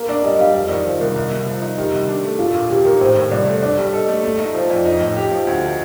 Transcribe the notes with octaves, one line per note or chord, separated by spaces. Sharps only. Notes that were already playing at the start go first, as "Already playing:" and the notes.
Already playing: A#3 A#4
D4 D5
G3 D#5
G3 F5
F2 D#5
D#3 D5
F3 C5
C2 A#4
C2
C2
F3
D#4
D#3 G4
C2
D4
A3
A#2 F4
A#2
D#2 G4
D#3 A#4
A2 C5
A2
C2 D5
A3
D4 D5
G3
A4 D#5
A3
A3
D#4
F3 C5
F2 D5
D#4 D#5
A2
G4
F3
D2